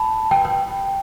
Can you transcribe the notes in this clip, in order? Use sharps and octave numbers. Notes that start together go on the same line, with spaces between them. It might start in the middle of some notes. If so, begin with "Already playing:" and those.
Already playing: A5 B5
G5
G5